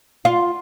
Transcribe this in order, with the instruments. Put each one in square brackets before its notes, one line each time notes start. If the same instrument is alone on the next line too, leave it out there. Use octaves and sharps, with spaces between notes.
[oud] F4